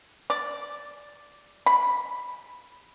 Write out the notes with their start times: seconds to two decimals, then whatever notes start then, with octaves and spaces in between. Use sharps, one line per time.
0.30 D5
1.66 B5